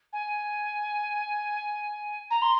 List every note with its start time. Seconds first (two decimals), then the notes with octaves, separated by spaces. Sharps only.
0.12 G#5
2.30 A#5
2.41 C6